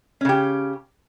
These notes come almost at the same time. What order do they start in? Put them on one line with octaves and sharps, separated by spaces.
C#4 C#3 G4